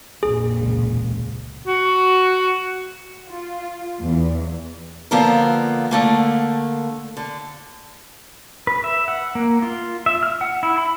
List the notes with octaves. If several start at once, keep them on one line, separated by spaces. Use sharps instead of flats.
A#1 F2 G#4
E1 C#2
F#4
F4
E2
D3 F3 A#3 B3 A4 A#4
D3 A3 A#3
D3
B4
E5
F#5
A#3
F4
E5
F6
F#5
E4
B5